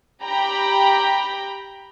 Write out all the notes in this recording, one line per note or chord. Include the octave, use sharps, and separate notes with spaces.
G4 G5 A#5 B5